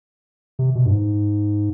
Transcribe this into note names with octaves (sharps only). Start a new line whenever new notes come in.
C3
B2
G2
G#2